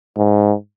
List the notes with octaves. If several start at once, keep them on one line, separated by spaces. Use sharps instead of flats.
G#2